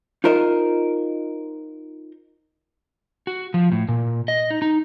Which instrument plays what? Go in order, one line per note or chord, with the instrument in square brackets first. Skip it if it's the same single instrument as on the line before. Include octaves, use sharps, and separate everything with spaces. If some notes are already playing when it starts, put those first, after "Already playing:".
[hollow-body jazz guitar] D#4 F4 A#4 C5 D#5
[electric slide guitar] F#4
F3
A2
A#2
D#5
D#4
D#4